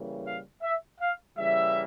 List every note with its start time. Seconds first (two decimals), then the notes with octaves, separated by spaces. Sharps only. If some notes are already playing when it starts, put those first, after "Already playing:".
Already playing: C#3 E3 G3 A#3
0.26 F5
0.63 E5
1.00 F5
1.38 C#3 E3 G3 A#3 E5